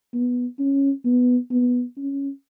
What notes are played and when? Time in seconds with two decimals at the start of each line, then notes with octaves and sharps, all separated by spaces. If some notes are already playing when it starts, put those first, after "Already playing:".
0.14 B3
0.59 C#4
1.05 B3
1.50 B3
1.97 C#4